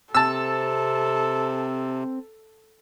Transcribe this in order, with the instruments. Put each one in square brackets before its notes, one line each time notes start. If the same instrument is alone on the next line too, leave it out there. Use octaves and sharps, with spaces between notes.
[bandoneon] C3 [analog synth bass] C4 [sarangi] A4 [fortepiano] A5 E6